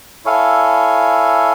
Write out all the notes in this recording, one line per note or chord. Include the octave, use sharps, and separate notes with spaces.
E4 A4 C#5 F5 G#5